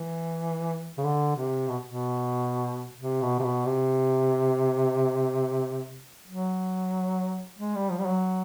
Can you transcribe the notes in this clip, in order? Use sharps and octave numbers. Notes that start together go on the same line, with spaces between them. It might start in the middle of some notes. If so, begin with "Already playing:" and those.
Already playing: E3
C#3
D3
C3
B2
B2
C3
B2
C3
B2
C3
F#3
G#3
G3
F3
G3
F#3